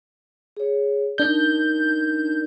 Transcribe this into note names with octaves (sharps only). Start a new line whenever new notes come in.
G#4 C#5
D4 D#4 A#4 D5 G6